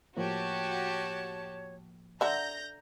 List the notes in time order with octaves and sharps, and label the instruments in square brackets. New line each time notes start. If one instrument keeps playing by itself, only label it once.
[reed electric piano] A2 F3 A#3 [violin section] F#4 G4 A5 [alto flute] C#5
[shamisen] D3 E5 [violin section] A#5 G6 A#6